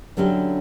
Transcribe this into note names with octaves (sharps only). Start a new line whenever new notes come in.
D3 F#3 C#4 E4 G4